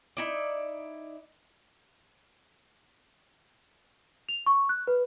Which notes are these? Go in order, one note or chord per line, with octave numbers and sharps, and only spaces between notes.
D#4 E4 D5
F7
C#6
F#6
B4